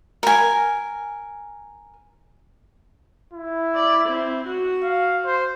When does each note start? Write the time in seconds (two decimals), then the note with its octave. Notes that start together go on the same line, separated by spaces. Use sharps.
0.23 A#4 G#5
3.33 E4
3.75 D5
4.08 C4
4.46 F#4
4.83 F5
5.26 C5